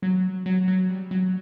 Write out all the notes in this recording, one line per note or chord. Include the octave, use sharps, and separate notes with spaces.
F#3
F#3
F#3
G3
F#3